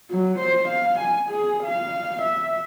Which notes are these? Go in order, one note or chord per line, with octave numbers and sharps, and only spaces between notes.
F#3
C5
F5
G#5
G#4
F5
E5